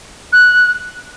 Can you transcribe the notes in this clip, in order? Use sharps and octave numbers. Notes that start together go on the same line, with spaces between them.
F#6